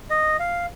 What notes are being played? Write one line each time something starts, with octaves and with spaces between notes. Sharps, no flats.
D#5
F5